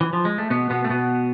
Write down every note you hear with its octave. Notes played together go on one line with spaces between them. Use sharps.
E3
F3
G#3
A3
B2 B3
B2 B3
A3
B2 B3